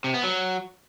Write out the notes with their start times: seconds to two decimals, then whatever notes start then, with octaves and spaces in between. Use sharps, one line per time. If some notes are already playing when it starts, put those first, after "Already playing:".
0.04 C3
0.14 B3
0.23 F#3